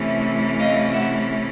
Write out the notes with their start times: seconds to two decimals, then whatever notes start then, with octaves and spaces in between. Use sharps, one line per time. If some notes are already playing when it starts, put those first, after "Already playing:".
Already playing: C3 E3 A3 C#4
0.60 D#5 F5
0.94 E5 F#5